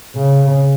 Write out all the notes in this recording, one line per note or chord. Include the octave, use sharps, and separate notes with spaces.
C#3